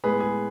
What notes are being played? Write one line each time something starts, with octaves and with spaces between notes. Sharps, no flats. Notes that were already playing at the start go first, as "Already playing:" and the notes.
A2 G#3 B3 G#4 B4
G#4